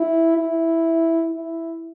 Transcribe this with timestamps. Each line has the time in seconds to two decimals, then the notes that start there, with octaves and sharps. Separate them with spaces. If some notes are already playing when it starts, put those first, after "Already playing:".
Already playing: E4
0.37 E4
1.33 E4